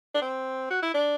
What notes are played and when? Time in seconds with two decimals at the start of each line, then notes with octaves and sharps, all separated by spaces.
0.15 D4
0.22 C4
0.70 F#4
0.82 E4
0.94 D4